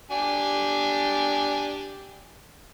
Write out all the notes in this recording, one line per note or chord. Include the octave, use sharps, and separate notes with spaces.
D4 G4 G#5